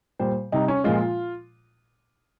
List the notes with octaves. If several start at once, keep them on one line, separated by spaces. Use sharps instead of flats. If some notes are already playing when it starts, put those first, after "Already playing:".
A#2 G3 C5
C3 G3 D#4
C#4
A#2 F3 G#3 F4